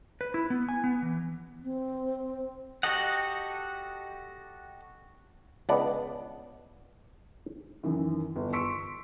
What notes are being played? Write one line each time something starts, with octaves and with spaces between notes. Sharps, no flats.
B4
E4
B3
G#5
B3
E3
C4
F#4 G4 A4 D#5 F#5
C#2 B3 D4 D5 D#5 F#5
F#2 D#3 E3
G1
C6 C#6 E6 B6 C#7 D7